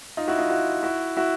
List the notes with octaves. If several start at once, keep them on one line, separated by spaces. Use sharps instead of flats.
D#4 F4
E4 F#4
D#4 F4
E4 F#4
E4 F#4
E4 F#4